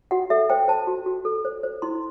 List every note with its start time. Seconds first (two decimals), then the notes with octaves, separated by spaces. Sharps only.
0.11 F#4 F#5
0.30 A4 E5
0.50 C5 G5
0.68 C5 A5
0.87 F#4
1.06 F#4
1.25 A4
1.45 C5
1.63 C5
1.82 E4 C6